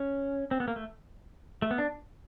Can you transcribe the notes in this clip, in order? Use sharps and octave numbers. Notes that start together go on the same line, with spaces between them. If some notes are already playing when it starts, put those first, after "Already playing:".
Already playing: C#4
C4
B3
A#3
A3
A3
B3
D4